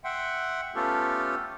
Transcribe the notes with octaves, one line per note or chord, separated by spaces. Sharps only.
E5 F#5 G5 C6
A3 B3 C#4 F4 G4 A4